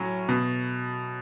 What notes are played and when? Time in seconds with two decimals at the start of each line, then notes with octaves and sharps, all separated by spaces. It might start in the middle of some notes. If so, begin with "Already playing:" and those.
Already playing: A2 F#3 C#4
0.29 B2